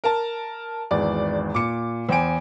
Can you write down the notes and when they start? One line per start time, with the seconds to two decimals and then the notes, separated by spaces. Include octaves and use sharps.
0.04 A#4 A5
0.91 G#1 E2 D5
1.55 A#2 D6 C#7
2.09 E2 C5 G5 G#5 D7